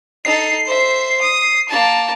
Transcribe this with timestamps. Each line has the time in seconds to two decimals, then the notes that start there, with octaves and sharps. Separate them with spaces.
0.25 D#4 A4 C7
0.65 C5 E5
1.21 D#6
1.68 A#3 A5